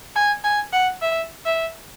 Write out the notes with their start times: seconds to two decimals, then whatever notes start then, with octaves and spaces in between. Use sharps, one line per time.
0.16 G#5
0.44 G#5
0.73 F#5
1.02 E5
1.46 E5